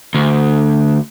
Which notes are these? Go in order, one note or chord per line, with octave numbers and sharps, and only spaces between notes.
D2